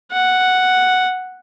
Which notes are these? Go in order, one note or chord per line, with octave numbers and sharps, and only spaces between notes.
F#5